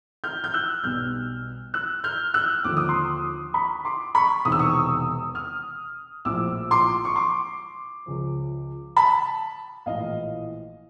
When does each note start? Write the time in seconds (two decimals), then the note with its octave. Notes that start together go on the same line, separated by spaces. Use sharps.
0.24 F6 G6
0.44 G6
0.54 E6 F#6
0.83 B1 B2 G3 F6 G6
1.74 E6 F#6
2.04 F6 G6
2.34 E6 F#6
2.64 D#2 D3 F3 D6
2.77 D#6
2.88 C6 D6
3.54 B5 C#6
3.85 C6 D6
4.15 B5 C#6
4.45 E1 E2 C3 D#3 D#6
4.52 E6
4.59 C#6 D#6
5.35 D#6 F6
6.25 A#1 A2 F3 D6 E6
6.71 C6 D6
7.05 C#6
7.15 C6 D6
8.06 C#2 C#3 F3
8.97 A5 B5
9.86 A#1 A2 E3 D#5 F5